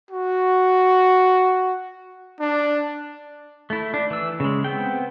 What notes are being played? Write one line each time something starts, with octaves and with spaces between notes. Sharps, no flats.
F#4
D4
A3 E4
D4
E3 E6
C#3 G#3
B3 C4 G5